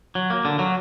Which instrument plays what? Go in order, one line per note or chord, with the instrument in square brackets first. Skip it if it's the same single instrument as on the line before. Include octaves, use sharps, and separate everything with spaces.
[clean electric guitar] F#3
A#3
D3
F#3